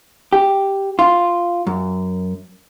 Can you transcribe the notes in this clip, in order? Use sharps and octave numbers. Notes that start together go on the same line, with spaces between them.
G4
F4
F#2